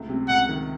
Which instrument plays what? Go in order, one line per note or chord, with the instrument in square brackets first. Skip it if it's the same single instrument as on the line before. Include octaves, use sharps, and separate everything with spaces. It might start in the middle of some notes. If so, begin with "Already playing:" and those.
Already playing: [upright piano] C#2 A3
C3
[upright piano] C#2 [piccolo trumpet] F#5
[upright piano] D#3